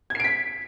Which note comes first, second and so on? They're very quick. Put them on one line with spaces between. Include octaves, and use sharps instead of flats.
G#6 C7 D7 B6